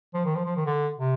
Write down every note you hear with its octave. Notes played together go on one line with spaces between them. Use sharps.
F3
D#3
F3
F3
D#3
D3
C3